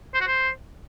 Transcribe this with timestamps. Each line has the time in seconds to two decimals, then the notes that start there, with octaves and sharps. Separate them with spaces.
0.14 C5
0.21 F#4
0.27 C5